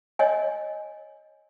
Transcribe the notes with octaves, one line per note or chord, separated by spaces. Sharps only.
C#5 D#5 G#5